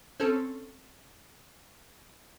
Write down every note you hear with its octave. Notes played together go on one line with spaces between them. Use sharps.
C4 C#4 A4